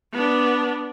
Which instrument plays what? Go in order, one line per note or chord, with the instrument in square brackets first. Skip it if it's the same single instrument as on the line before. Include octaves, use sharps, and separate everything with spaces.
[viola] B3 D4